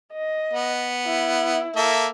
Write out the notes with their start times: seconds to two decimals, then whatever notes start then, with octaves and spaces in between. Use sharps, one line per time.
0.13 D#5
0.53 B3
1.07 E4
1.76 A#3 A4 E5